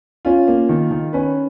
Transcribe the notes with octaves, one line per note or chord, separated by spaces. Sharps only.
C#4 F4
A#3
D#3
D#3
C#4 B4